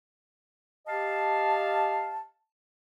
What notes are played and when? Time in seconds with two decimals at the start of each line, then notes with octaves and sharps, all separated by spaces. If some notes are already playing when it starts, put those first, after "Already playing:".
0.87 G4 D#5 F5 A5